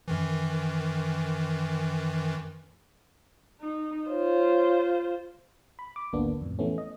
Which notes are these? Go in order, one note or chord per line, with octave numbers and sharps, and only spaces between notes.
F#2 D#3 E3
D#4
F4 C5 C#5
B5
D6
G#1 D2 A#3 B3 D4
F2 A2
E3 A3 B3 C#4
D#5